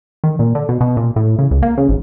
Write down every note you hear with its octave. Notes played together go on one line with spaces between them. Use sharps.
D#3
A#2
D3
B2
B2
A#2
A2
C#3
C#2
A#3
C#3
G#1